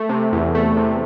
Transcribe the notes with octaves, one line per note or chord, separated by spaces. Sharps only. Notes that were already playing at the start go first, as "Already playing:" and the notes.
Already playing: A3
C3
E2
A3
C3